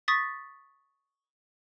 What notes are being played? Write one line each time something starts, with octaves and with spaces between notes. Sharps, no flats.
C#6 D#6 A6 B6